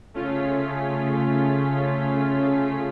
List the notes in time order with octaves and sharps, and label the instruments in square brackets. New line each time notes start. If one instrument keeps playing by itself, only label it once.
[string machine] C#3 G#4 B6 [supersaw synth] A3 C#4 F4